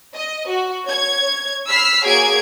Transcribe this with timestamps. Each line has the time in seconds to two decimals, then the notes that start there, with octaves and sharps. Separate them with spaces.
0.15 D#5
0.49 F#4
0.86 C#5 G#6
1.69 B5 E6 F6 B6 C7
2.05 A#3 F#4 G#4 C#5 G#6 D7